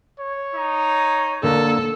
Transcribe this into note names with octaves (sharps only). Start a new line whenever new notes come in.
C#5
D#4
D3 A#3 A4